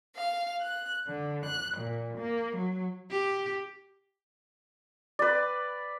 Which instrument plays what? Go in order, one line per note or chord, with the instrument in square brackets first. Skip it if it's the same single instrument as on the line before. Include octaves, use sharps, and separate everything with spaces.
[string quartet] F5
F#6
D3
F#6
A#2
A#3
F#3
[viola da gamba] G4
[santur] B4 D5